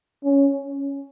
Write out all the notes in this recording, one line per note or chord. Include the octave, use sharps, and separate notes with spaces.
C#4